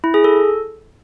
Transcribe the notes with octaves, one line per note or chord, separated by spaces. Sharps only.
E4
G#4
A4